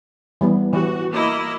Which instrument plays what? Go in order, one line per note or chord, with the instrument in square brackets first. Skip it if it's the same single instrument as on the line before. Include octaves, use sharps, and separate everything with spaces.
[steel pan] E3 G3 B3
[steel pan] E3 G4 [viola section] F#4
[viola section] A#3 E4 D#5